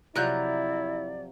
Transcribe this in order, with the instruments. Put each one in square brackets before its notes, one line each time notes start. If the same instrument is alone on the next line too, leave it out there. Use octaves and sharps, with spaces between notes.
[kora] C3 F3 F#3 [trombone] E4 [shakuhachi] D5 [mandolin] A#5 F#6 G6